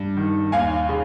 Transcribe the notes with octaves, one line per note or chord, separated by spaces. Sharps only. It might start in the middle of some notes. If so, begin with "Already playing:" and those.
Already playing: G2
D#3
D#2 F5 G#5
C#3